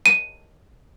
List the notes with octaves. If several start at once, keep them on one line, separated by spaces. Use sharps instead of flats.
D#7